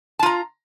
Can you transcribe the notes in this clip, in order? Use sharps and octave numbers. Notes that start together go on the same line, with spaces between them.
F4 A5 A#5